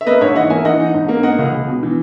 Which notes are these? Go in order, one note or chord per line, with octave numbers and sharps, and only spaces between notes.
E5
A#3 B4 D#5
G#2 C#5 E5
E3 D#5 F#5
A#3 E5 G#5
E3 D#5 F#5
D#4
G#2
A#3
A#3 D#5 F#5
C#2
C#2
B2
E3